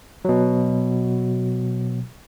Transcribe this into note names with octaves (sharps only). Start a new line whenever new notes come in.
B2 F#3